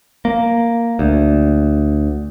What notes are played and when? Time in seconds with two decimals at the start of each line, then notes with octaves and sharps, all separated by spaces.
0.25 A#3
0.99 D2